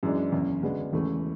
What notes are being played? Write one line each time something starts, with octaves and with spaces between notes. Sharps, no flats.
F#2 E3 G#3 D4
F#1 E2 C#3
D2 C#3 G#3 B3 D4
E1 E2 C#3 E3 A3